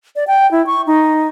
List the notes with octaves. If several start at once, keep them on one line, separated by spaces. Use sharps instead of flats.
D5
G5
E4
C#6
D#4